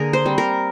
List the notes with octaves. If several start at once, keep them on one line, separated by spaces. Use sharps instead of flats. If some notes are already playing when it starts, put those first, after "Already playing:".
Already playing: D3 A#3 G#4 A#4
C5
G3 C4
A#4